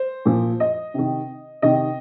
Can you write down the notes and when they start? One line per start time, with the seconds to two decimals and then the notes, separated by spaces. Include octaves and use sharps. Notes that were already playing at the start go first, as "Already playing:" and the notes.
Already playing: C5
0.26 A#2 F3
0.60 D#5
0.94 C3 D#3
1.62 C3 D#3 D#5